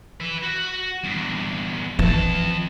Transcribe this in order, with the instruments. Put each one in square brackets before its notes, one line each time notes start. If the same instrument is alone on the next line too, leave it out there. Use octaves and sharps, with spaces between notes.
[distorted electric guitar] B4 E5
F#4
E2 G2
[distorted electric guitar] F2 A5 [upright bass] E3